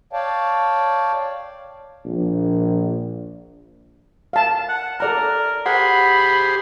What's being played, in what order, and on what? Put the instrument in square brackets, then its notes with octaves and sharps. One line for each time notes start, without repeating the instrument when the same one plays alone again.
[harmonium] C#5 D5 F5 G5 A5
[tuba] A#1
[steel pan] F5 A5
[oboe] F#5
[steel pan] A4 D5 A#5 [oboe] A#4
[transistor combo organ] G4 G#4 C5 [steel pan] F#5 [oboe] B5